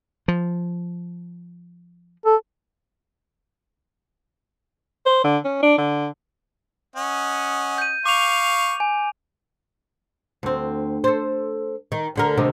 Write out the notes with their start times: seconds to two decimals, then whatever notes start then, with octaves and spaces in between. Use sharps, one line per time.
0.28 F3
2.26 A4
5.06 C5
5.24 D3
5.45 C#4
5.63 D4
5.78 D3
6.96 C#4 D#5 F#5
7.78 G6 D#7
8.06 F5 C#6 D6 F7
8.80 G#5
10.43 D2 C4
11.04 A4 C5
11.92 D#3
12.16 D2 D3 A#4
12.37 D2 C3 D#3